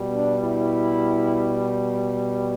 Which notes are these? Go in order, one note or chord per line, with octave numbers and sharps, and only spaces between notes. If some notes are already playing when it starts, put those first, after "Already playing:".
Already playing: B2 G3
D4
E4